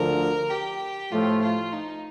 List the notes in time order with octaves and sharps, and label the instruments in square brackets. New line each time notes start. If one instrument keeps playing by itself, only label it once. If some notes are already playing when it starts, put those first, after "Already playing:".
Already playing: [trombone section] D2 D3 F3 [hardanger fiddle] A#4
[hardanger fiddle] G4
[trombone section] A2 F3 A3 [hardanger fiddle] F4
[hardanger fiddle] F4
D#4